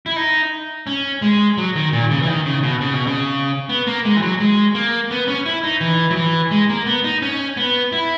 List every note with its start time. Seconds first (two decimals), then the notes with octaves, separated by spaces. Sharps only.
0.06 E4
0.16 D#4
0.87 C#4
1.22 G#3
1.58 F#3
1.76 D#3
1.93 A#2
2.11 C#3
2.22 E3
2.28 D#3
2.46 C#3
2.63 B2
2.81 C#3
2.94 B2
3.07 C#3
3.69 B3
3.87 A#3
4.05 G#3
4.17 E3
4.22 F#3
4.40 G#3
4.75 A#3
5.11 B3
5.28 C#4
5.46 E4
5.63 D#4
5.81 E3
6.11 F#3
6.16 E3
6.51 G#3
6.69 A#3
6.86 B3
7.04 D#4
7.22 C#4
7.57 B3
7.92 E4